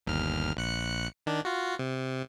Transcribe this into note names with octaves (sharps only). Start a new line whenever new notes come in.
G1 D#2 F6
A#1 F#6 C#7
D#3 D4
F4 F#4
C3